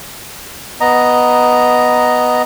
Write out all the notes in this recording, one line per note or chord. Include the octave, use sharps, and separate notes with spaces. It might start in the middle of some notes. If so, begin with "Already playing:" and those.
B3 D#5 A#5